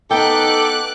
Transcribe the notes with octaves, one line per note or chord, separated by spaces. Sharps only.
B3 D#4 A4 G5 D6 F#6